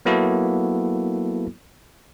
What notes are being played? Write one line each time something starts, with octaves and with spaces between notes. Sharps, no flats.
F#3 A#3 B3 E4 F#4 A4